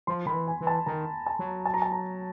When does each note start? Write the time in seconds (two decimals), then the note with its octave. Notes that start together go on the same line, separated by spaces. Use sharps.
0.07 F3 C6
0.26 D#3 B5
0.33 E3
0.47 G#5
0.61 E3
0.67 A5
0.86 D#3 A#5
1.26 A5
1.39 F#3
1.66 A5
1.74 A#5
1.82 A5
1.92 A#5